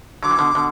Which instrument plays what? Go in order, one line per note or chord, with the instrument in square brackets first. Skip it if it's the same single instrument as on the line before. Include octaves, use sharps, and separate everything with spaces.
[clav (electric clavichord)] D3 F#3 [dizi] D6
[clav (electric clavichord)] E3
B2 D3
B2 D3